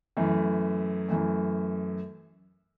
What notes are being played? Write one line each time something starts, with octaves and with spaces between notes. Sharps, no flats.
F#2 E3 A3
F#2 E3 A3